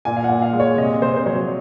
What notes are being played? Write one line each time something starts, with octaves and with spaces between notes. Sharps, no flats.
A#2 G#5
F5
F#5
A#2
F5
G#3
C#5
C3 D#5
C3 C5
C5
F#3 C#5